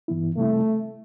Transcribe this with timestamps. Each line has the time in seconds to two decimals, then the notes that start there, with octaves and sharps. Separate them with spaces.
0.08 G2 E3 B3 E4
0.37 C3 G3 A3 C4 E4